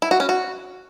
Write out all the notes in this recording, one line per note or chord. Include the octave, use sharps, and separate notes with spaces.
E4
F#4
C#4
F#4